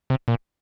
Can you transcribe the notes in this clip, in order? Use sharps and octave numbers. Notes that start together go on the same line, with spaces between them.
C3
A#2